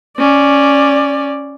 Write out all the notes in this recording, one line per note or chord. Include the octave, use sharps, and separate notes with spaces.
C#4 D5